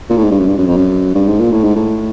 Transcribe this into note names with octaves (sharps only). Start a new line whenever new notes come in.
A#2
A2
G#2
G2
F#2
G2
F#2
F2
F#2
G2
G#2
A#2
A2
G#2
A2